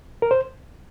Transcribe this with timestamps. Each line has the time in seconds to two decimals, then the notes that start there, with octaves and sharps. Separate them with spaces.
0.22 A#4
0.31 C5